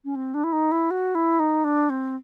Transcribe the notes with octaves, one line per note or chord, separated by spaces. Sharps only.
C#4
C4
D4
E4
D#4
E4
F#4
E4
D#4
D4
C4